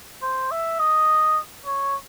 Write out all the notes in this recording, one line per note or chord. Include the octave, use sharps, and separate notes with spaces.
C5
E5
D#5
C#5